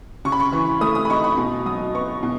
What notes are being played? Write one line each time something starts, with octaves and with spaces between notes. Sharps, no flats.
C#3 C#6
B5
C#6
E3
A3 D#6
D#6
B5
D#4 C#6
B5
B2
F#3 D#6
B3 C#6
B2